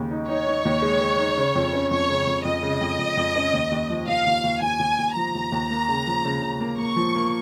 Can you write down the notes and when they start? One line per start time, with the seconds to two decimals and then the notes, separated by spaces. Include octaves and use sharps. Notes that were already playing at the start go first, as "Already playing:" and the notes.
Already playing: D#2 C#3
0.11 D#4
0.29 D#4 C#5
0.47 D#4
0.65 D#2
0.82 G#3
1.01 G#3
1.19 D#4
1.38 C#3
1.55 F2
1.73 C#4
1.91 F2 C#5
2.10 C#3
2.27 F2
2.45 F2 D#5
2.63 C#3
2.81 F2
2.99 F2
3.17 F2
3.35 C#4
3.53 D#2
3.71 D#2
3.90 F3
4.07 D#2 F5
4.26 D#2
4.44 D#2
4.62 D#2 G#5
4.79 D#2
4.98 D#2
5.16 F3 A#5
5.35 D#2
5.52 D#2
5.71 A#3
5.88 C#3
6.07 F3
6.25 C#3
6.42 C#3
6.60 A#3
6.78 A#3 C#6
6.96 F3
7.15 A#3